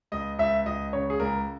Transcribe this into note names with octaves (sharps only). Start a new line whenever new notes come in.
C#2 D#5
C#2 E5
C#2 D#5
C#3 C#5
G#4
C#2 A#4